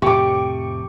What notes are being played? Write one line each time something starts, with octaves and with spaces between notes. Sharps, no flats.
F2 A2 C3 G4 C#6 D6